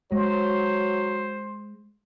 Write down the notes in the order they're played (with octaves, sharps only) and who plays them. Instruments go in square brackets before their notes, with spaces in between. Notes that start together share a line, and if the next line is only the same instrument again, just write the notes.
[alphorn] F#3 [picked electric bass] G#3 [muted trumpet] C5